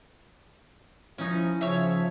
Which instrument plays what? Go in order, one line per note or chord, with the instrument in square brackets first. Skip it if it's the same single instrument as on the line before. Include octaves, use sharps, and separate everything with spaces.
[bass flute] F3 [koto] C#4 D#4 [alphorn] E4
[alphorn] C#3 [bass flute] F3 [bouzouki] C#5 E5